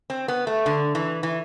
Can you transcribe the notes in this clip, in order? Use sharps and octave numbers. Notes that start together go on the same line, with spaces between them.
C4
B3
A3
D3
E3
E3